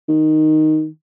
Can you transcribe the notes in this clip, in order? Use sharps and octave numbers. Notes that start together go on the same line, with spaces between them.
D#3